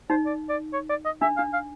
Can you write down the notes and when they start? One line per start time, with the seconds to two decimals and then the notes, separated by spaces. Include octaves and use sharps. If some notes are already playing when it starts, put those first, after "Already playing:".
0.10 D#4 C5
0.26 D5
0.49 D5
0.73 C#5
0.90 D5
1.05 D#5
1.22 D4 E5
1.37 D4 F5
1.53 F5